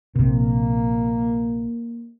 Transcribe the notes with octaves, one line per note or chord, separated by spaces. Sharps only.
A#1 C3 A#3